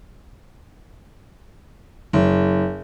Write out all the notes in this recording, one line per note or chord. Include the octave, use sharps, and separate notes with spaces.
F#1